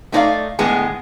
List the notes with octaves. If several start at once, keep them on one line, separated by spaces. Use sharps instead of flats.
A3 D#4 E4 A#4 D5 F5
A2 D3 G#3 B3 G#4